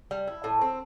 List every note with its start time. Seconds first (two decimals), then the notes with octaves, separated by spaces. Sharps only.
0.11 G3
0.27 E4
0.44 A2
0.61 C4